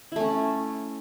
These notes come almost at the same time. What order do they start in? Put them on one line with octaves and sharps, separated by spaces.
E4 A3 C#4